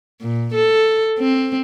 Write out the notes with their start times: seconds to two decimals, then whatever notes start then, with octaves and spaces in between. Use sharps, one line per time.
0.22 A#2
0.55 A4
1.19 C4